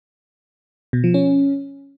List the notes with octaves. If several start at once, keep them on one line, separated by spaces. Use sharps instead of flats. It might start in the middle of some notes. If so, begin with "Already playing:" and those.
B2
F3
C#4